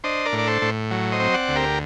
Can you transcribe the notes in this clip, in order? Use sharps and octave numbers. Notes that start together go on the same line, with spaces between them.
D4 C5 D#5
A#4 D5
A2
D5
A4 C5
A2
F#3
C5 D#5
C4
D5 F#5
D2
G4 A#4